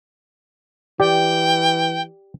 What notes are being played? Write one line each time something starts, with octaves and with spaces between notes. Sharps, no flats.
E3 G4 D5 G5